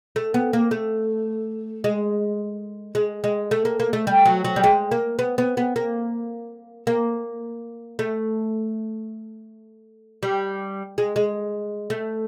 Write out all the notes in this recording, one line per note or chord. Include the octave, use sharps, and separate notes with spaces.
A3
B3
A#3
A3
G#3
G#3
G#3
A3
A#3
A#3
A3
G3
F#3
F#3
G3
G#3
A#3
B3
B3
B3
A#3
A#3
A3
G3
G#3
G#3
A3